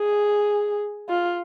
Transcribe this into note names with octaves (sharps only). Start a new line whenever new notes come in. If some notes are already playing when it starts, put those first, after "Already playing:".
Already playing: G#4
F4